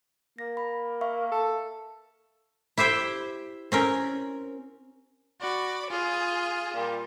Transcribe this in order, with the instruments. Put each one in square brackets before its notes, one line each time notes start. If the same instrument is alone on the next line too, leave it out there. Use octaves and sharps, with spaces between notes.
[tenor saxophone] A#3 [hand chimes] A#6
[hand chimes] B5
E5 F5 C#6
[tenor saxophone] A4
[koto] E4 G4 C5 E5 G5
C4 C#4 A#4
[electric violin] F#4 [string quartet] D5 B5
[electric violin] F4 [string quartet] G#4
[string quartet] A#2 G3